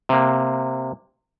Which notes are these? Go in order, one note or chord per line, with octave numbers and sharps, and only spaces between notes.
C3 A#3